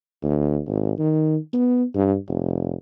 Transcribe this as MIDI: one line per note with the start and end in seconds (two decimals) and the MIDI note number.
0.23 0.60 38
0.68 0.95 32
0.98 1.37 51
1.53 1.84 59
1.95 2.16 43
2.29 2.75 29